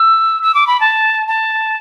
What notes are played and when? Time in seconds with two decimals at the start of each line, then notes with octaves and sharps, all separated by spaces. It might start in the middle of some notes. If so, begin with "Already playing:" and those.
Already playing: E6
0.42 E6
0.54 D6
0.67 B5
0.80 A5
1.27 A5